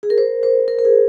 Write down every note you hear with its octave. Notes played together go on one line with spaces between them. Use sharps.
G#4
A#4
C5
C5
A#4
A#4
G#4